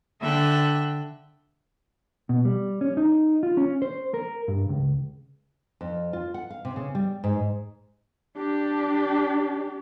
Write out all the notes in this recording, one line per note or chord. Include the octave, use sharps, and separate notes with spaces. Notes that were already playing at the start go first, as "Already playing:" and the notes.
D3 E5 G5 F#6
B2
G3
C#4
D#4
F4
C#4
C5
A#4
G2
C#2
F2
F4
F#5
F5
C3
C#3
G3
G#2
D4 G4